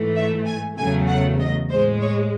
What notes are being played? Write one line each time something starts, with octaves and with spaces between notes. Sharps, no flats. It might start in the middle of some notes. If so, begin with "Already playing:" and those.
Already playing: G#2 E3 A3
E5
G#5
E2 C#3 F#3 A3 G#5
F#5
D#5
A2 G#3 C5
C#5